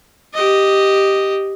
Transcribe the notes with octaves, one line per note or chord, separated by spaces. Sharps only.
G4 D#5